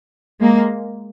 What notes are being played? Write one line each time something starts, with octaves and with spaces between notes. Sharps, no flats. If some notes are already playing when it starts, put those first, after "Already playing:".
G#3 A#3